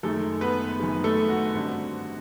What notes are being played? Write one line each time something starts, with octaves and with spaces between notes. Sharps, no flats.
F#1 F#2 D#3 G#3 A3 A4
B3 B4
F#1 F#2 D#3 G#3
A3 A4
F#4
G#1 G2 D3